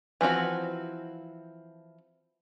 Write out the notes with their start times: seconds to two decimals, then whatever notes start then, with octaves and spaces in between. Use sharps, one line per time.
0.21 E3 F3 C4 F#4